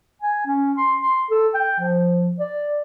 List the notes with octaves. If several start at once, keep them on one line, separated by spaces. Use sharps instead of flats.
G#5
C#4
C6
C6
A4
G5
F3
D5